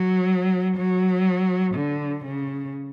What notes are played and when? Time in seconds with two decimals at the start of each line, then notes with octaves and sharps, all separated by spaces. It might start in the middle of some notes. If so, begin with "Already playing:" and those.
Already playing: F#3
0.77 F#3
1.75 D3
2.25 C#3